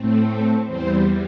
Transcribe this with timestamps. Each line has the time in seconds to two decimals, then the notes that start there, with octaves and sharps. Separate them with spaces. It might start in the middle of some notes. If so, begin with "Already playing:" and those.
Already playing: A2 A3 C4
0.27 A4
0.65 E2 E3 G3 C4 C5